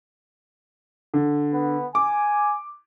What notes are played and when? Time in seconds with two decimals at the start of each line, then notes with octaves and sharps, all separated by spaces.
1.14 D3
1.53 B3
1.95 G#5 D6